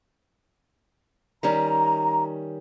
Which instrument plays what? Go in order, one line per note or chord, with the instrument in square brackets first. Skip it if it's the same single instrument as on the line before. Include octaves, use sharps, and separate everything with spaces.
[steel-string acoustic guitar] D#3 G3 C#4 [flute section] A#5